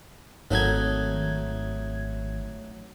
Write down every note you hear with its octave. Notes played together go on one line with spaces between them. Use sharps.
G#1 F#3 A3 D#4 G#6